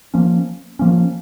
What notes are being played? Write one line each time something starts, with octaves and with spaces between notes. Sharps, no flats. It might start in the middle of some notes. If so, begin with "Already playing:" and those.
F3 A#3 C#4
F3 A#3 C#4